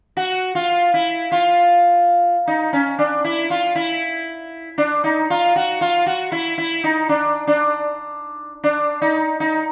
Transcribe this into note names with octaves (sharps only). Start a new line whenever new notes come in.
F#4
F4
E4
F4
D#4
C#4
D4
E4
F4
E4
D4
D#4
F4
F#4
F4
F#4
E4
E4
D#4
D4
D4
D4
D#4
D#4